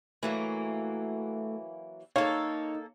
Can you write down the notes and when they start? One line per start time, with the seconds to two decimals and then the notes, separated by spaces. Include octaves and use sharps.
0.23 E3 F#3 A3 A#3
2.16 A#3 D#4 A4 C#5 F5